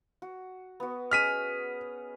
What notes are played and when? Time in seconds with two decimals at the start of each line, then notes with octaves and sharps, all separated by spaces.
0.22 F#4
0.80 B3 F#4
1.11 C#4 G#4 D#5 F6 B6 D#7